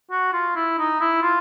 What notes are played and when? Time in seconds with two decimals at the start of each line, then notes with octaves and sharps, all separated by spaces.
0.11 F#4
0.33 F4
0.55 E4
0.78 D#4
1.01 E4
1.22 F4